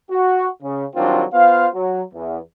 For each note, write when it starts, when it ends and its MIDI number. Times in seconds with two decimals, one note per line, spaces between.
0.11 0.47 66
0.63 0.85 49
0.96 1.24 51
0.96 1.24 54
0.96 1.24 55
0.96 1.24 60
0.96 1.24 62
0.96 1.24 65
1.33 1.68 59
1.33 1.68 65
1.33 1.68 72
1.33 1.68 77
1.74 2.02 54
2.14 2.39 40